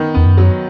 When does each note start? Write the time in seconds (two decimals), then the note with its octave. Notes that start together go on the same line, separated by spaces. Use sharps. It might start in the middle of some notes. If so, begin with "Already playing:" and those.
Already playing: D#3 B3
0.14 E2 B3
0.26 F#2
0.37 F#3